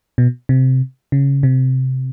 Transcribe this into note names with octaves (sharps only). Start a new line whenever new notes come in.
B2
C3
C#3
C3